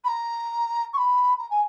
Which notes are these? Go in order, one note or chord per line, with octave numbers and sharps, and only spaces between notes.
B5
A#5
C#6
B5
A#5
G#5